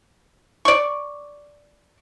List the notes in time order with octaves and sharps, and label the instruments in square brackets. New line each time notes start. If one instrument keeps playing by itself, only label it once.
[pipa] D5 C#6